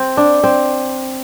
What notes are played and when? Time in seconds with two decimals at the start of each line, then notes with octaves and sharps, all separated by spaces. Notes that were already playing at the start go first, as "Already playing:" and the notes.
Already playing: C4
0.17 D4
0.44 C4